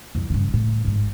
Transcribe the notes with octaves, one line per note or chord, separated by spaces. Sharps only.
C2 F2
G2 C#3
A2
G#1 G#2